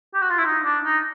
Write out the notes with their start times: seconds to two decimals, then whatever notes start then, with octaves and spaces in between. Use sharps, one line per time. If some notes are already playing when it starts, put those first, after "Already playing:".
0.14 G4
0.22 F#4
0.30 F4
0.38 E4
0.45 D#4
0.65 D4
0.85 D#4